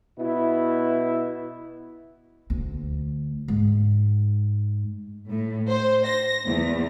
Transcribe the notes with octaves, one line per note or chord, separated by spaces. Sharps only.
B2 E4
D2
G#2
A2
C5
A#6
E2